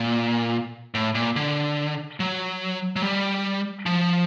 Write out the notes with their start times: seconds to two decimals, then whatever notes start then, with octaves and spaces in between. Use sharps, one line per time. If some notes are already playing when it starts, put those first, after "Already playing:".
Already playing: A#2
0.94 A2
1.15 A#2
1.36 D3
2.20 F#3
2.96 F#3
3.02 G3
3.86 F3